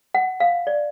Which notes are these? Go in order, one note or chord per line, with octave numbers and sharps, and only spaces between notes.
F#5
F5
D5